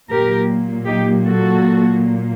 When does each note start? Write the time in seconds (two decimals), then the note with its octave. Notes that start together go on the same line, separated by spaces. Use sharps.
0.10 A#2 F#3 A#3 G4 A#4
0.87 D#4 G4
1.25 F#4 A4